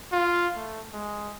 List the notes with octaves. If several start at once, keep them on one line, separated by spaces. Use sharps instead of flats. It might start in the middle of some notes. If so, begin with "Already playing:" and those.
F4
A3
G#3